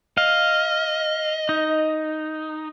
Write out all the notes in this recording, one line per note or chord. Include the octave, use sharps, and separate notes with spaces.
D#5 F5
D#4